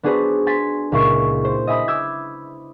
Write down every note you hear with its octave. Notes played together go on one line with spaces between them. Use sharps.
B3 D4 F#4 G#4 B4 C5
G#5 C6 G#6 A6 B6
C#2 A#2 E4 C#6 C7
C5
D#5 E5 G#5 B5 D#6
D6 E6 G6 G#6